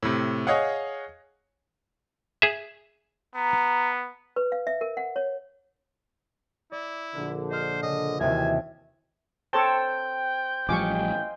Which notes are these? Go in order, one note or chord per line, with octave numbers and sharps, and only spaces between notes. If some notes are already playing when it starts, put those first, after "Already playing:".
A2 C3
G#4 C#5 D#5 F5 F#5
G#4 E5
B3 A#5
B4
F5
E5
A#4
F#5
C#5
E4 D5
A#1 D3 A#4
C5 D#5 F6
C#3 D#5
D#2 C3 D#3 E3 F#4 E5 G#5
C4 A4 C#5 G5 A5
A1 F3 G3 D#5 F5 G#5 C#6 D6